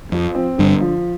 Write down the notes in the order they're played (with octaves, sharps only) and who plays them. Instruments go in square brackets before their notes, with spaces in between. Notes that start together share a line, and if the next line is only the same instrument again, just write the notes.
[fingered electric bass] F2 [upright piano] F3
[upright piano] C4
[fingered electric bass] G1 G2 [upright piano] D3
[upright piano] F3